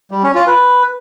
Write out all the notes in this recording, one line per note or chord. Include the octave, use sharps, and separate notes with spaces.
G3
C#4
F4
B4